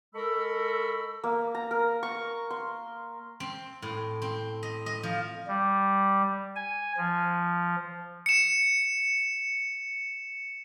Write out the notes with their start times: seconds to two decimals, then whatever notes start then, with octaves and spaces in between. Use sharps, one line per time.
0.15 G#3 A4 A#4 B5 C#6 E6
1.24 A#3
1.55 A#5
1.71 A#4
2.03 C#6
2.50 C6
3.40 C4
3.82 A2
4.22 C4
4.63 D#5
4.86 D#5
5.03 F3
5.48 G3
6.56 G#5
6.97 F3
8.26 C#7 E7